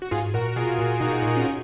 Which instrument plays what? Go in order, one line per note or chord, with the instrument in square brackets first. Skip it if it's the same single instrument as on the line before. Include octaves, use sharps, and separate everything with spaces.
[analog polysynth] F#4
[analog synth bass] G#2 [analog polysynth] F4 G#4
[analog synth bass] A#2 [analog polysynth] F#4 A#4
[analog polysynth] A#4
[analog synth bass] B2 [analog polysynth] F4 G#4
[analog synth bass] A#2
[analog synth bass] B2 [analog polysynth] D#4 F#4
[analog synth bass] A#2 [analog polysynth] D#4
[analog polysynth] C#4